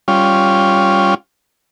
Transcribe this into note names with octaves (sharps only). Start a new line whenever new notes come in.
G3 C#4 F4